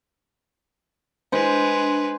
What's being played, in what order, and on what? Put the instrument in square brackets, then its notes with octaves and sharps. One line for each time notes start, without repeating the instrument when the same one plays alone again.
[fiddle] G#3 B4 [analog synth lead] D4 [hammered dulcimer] C5